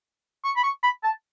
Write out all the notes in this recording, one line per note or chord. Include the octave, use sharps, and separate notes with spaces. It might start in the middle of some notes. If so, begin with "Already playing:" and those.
C#6
B5
C#6
B5
A5